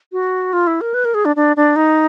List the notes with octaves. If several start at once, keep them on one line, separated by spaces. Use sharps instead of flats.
F#4
F4
E4
A#4
B4
A#4
G#4
D4
D4
D4
D#4